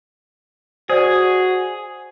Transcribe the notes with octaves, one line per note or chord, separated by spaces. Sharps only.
F#4 G#4 C5 D5 G#5